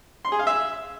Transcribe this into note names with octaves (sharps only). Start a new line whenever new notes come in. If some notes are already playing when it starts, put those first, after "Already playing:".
C6
G#4
F5
E5